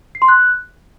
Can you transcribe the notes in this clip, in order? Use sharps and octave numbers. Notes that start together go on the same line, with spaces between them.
C7
C6
F#6